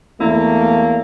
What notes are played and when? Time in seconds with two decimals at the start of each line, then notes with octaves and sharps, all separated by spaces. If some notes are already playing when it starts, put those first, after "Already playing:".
0.20 E2 F#3 A3 A#3 E4